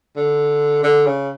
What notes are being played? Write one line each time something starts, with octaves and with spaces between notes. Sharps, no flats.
D3
D3
C#3